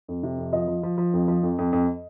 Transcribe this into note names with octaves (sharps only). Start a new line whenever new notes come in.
F2
C3
F2
F3 D#5
F3
F3
F3
F2
F3
F2
F2
F2